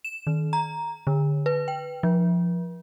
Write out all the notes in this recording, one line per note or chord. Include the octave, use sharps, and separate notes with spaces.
E7
D#3
A#5
D3
B4
G5
F3